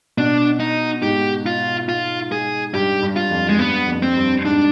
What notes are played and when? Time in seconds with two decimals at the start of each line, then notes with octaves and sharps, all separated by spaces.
0.17 B2 D4
0.60 D#4
1.02 G#2 G4
1.46 F4
1.89 F4
2.32 G#4
2.74 G2 G4
3.02 G2
3.16 F4
3.31 F2
3.49 G#3
3.59 G2 B3
3.88 F2
4.03 C4
4.17 G2
4.45 G#2 D4